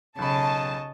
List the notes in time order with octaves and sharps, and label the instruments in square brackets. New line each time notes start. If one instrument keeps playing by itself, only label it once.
[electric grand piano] B1 B5 [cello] C#3 [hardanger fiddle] D#5 C#6 [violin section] A5